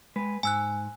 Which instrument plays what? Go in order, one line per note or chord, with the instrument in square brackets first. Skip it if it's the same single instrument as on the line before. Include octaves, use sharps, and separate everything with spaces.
[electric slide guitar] G#3 B4
[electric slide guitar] G#2 [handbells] G#5 E6 F#6